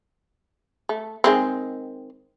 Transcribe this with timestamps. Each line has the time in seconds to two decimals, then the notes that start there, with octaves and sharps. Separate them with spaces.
0.89 A3
1.24 D#3 G#3 C4